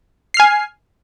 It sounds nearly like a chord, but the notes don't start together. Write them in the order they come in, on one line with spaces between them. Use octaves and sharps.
C7 F6 G#5